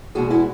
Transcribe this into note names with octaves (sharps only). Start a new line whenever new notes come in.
E2 B2 G#3 F#4 G#4
E4 F#4